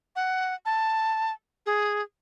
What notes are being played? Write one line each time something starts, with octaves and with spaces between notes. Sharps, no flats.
F#5
A5
G#4